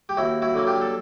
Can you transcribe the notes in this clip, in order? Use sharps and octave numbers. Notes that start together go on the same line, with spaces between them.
G4
D#2 E4 F#4
E4 F#4
D3 F#3 A#3
F4 G4
A4